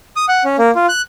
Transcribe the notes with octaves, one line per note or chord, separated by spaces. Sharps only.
D#6
F#5
C#4
A#3
F4
F#6